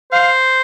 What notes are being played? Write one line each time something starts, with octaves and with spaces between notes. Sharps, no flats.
C5 F5